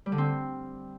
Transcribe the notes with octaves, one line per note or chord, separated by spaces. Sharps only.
G3
D3
C4